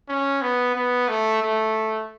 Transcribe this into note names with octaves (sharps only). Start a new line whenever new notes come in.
C#4
B3
B3
A3
A3